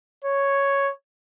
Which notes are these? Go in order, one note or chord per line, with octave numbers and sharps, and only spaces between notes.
C#5